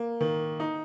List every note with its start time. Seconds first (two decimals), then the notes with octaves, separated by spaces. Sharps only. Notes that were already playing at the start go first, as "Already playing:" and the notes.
Already playing: A#3
0.21 D#3
0.60 D#4